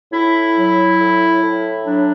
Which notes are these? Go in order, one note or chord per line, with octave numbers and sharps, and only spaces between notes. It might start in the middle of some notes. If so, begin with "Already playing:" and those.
A2 E4
F#3
A2
A2
F#3 D4